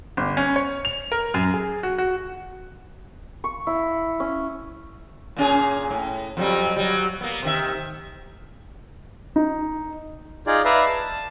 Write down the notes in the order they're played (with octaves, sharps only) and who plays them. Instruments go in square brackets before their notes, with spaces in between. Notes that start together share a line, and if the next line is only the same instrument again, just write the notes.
[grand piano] G1
C#4
C#5
F7
A#4
F#2
G#4
F#4
F#4
[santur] C#6
E4
C#4
[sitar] A#2 C#4 G#4
A2
F2 F#3 G3
F#3 G3
A#3 B3
C3 D#3 E5
[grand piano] D#4
[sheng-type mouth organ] D#4 F4 G#4 D5
B4 D5 E5 F5 A#5
A5
A5